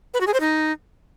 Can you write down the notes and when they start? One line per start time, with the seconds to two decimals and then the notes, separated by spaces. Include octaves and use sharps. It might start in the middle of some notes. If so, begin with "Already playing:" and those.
0.14 B4
0.20 F#4
0.27 G#4
0.34 C5
0.40 D#4